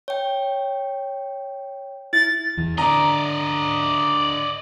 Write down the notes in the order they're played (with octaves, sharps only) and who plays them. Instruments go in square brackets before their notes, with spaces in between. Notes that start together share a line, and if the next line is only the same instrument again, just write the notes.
[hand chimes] C#5 G5
[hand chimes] E4 [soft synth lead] A6
[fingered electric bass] E2 E3
[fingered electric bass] D3 [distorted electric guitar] D5 D#5 [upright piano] A#5